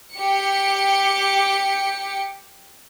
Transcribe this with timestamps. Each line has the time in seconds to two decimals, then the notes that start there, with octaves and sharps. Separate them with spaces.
0.15 G4 C#7